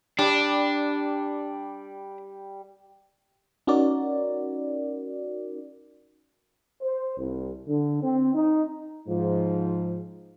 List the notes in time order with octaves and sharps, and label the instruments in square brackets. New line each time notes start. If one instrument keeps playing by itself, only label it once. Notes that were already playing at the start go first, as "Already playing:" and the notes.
[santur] G3 [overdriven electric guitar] D4
[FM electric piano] C#4 D#4 F#4 A#4 D5
[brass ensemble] C5
C2
D3
C4
D#4
[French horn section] G#2 F3